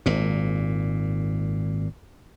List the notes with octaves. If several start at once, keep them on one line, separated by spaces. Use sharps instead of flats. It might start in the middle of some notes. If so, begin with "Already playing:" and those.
G#1 A#2